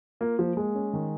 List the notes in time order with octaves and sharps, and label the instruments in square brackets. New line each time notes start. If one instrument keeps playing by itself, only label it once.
[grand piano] A#3 [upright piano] F4
[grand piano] F3 [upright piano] A#3
[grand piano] G#3 [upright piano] G#4
[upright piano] C#4
D#3